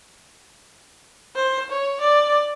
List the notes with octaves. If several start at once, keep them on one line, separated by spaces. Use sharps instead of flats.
C5
C#5
D5